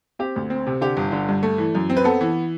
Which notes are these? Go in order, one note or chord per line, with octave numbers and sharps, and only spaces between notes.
C4 G4
D2
C4
C3
D3 G4
G1
D3
G2
A3
E3
F#2
C4
B4
B3 A4
E3